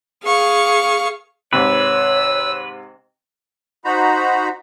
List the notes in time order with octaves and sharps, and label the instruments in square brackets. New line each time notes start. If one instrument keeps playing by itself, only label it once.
[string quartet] G#4 F5 C#6
[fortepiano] G#2 C3 [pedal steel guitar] B4 [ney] C#5 [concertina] E6
[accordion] D#4 F#4 C5 A#5 B5